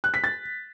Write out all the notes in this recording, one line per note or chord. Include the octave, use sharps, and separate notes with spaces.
F#6
B6
A6